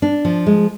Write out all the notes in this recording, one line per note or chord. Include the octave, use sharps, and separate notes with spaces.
D4
F3
G#3